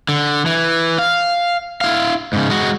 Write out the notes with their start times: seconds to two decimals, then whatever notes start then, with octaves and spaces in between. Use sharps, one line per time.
0.09 D3
0.46 E3
0.99 F5
1.81 E4 F5
2.33 G#2 C#3
2.50 G#3 F#4